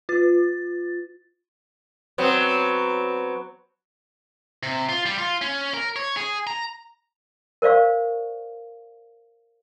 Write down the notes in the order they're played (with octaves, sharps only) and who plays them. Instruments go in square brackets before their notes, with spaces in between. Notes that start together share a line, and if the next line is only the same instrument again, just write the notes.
[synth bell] F4 A6
[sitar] F#3 B3 C4
[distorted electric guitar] C3
F4
G3
F4
C#4
A#4
C#5
G#4
A#5
[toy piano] A#4 C5 D5 F5 C#6